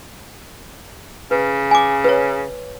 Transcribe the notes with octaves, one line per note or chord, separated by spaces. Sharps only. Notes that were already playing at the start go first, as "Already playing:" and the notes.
C#3 B4
G#5 D6
B4 C#5